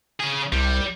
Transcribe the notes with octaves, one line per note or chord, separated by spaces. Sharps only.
C#3 G#4
C2 G3